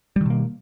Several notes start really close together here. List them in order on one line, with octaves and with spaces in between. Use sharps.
G3 D#3 B2 A#3